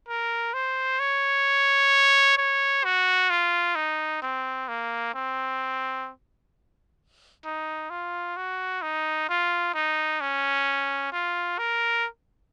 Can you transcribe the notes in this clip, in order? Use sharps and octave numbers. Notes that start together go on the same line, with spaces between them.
A#4
C5
C#5
C#5
F#4
F4
D#4
C4
A#3
C4
D#4
F4
F#4
D#4
F4
D#4
C#4
F4
A#4